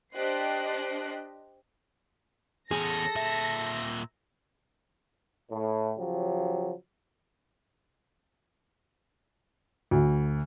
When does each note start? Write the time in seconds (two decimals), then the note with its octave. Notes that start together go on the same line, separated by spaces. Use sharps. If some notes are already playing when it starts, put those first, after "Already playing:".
0.14 D4 G4 C5 D#5 F#6 C7
2.71 E2 C#4 G#4 A4 A#6
3.16 A#2 E5
5.51 A2
5.99 C#3 F3 F#3 G4
9.91 D2